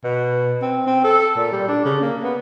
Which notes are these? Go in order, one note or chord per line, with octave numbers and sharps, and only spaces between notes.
B2
C4
C4
A4
A#2
G3
D4
C#3
A#3
B3